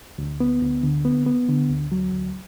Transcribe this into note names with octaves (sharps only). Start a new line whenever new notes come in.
D2
B3
D2
D3
B3
B3
D3
D2
F#3
D2